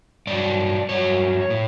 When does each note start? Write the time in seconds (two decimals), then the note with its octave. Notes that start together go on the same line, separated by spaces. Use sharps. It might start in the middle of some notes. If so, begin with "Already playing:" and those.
0.27 G2 F#3 D5
0.89 G2 F#3 C#5
1.50 A2